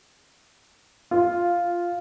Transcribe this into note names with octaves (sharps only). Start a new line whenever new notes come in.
F4